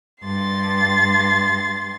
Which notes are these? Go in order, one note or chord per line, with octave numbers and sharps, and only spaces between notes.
G2 C6 A6